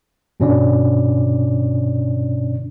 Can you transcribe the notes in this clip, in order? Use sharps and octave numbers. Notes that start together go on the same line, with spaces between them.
G2 B2 D3 C#4 D4 D5